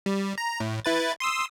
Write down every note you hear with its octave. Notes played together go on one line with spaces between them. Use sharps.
G3
A#5
A2
E4 B4 A6
C6 D#6 E6